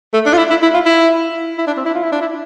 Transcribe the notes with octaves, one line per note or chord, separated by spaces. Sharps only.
A3
D4
F4
E4
E4
E4
F4
E4
E4
D4
C4
E4
F4
E4
D4
E4